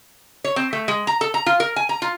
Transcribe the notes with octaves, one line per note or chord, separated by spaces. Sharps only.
C#5
C4
A3
G#3
A#5
A4
A#5
F4
A#4
G#5
A#5
F4